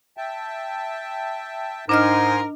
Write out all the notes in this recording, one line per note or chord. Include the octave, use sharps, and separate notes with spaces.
E5 G5 A5
G#2 D4 D#4 A#4 D#5 G#5 C6 F6